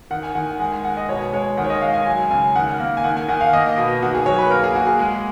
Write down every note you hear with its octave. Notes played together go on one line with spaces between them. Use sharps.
D#3 F#5
G#5
D#3 F#5
G#5
G#3 F#5
G#5
G#3 F#5
D#5
B2 C#5
G#3 C#5
D#3 F#5
C#5
D#5
G#3 F5
G#5
F#3 G#5
C#3 G#5
D#3 F#5
A#3
G#5
D#3 F#5
G#5
D#3 F#5
F5
A#3 D#5
B2
D#3 F#4
G#4
F#3 C#5
B4
A#3 A#4
G#4
A#3 F#4
G#4
G#3